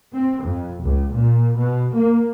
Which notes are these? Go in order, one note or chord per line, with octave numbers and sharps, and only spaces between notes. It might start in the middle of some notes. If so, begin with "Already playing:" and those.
C4
F2
C#2
A#2
B2
A#3